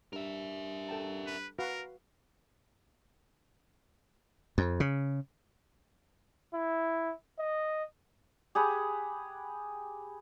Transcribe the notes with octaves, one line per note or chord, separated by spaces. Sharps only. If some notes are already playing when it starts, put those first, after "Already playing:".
G2 A#4 E5
A4 G5 A5
B4
F#4 A#4 B4 F5
F2
C#3
E4
D#5
G4 G#4 F#5 B5